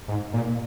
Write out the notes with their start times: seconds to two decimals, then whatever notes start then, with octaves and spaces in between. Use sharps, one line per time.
0.08 G#2
0.33 A#2